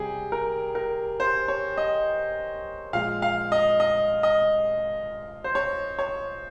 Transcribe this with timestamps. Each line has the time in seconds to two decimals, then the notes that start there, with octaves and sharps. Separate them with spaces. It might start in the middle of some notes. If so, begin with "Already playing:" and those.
Already playing: C3 G3 G4 G#4
0.32 A#4
0.75 A#4
1.20 C5
1.48 C#5
1.77 D#5
2.93 A#2 F3 G#3 F5
3.22 F5
3.52 D#5
3.80 D#5
4.23 D#5
5.44 C5
5.55 C#5
5.99 C#5